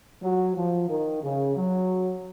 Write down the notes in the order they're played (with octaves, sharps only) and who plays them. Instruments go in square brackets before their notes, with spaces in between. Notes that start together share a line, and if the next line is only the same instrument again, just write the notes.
[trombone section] F#3
F3
D#3
C#3
F#3